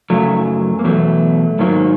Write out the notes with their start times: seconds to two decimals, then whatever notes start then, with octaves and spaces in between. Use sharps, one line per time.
0.10 F#2 C#3 F#3 A3
0.79 A#3
0.84 E2 B2 F#3 A3
1.59 G#2 D#3 F#3 A#3